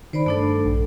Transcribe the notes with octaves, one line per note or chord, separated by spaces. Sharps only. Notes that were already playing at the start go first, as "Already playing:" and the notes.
D#3 C5 D5 B5
G2 A3 D4 A4
A#1